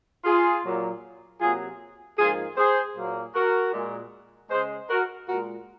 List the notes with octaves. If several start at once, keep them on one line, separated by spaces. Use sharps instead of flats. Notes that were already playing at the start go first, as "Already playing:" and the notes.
F4 G#4
A#2 F#3 A#3
C3 F#3 A#3 F4 G#4
G#2 F3 A#3 F4 G#4
G#4 C5
A#2 F#3 A#3
F#4 A#4
A#2 G#3
C#3 G#3 G#4 C5
F#4 A#4
A#2 G#3 F#4 A#4